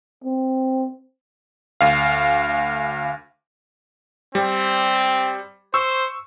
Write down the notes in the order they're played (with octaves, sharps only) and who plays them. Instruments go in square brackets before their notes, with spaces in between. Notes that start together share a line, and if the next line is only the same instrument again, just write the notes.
[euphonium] C4
[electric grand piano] D2 F5
[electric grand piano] G3 [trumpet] C4
[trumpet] C5 [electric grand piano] C#6 E6